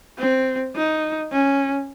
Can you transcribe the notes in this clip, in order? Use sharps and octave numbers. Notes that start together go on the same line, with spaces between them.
C4
D#4
C#4